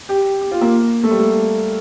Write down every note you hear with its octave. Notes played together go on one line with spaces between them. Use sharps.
G4
G4
F4
A#3
A3
G3
A3